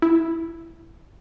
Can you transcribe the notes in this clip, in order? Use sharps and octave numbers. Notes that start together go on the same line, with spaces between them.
E4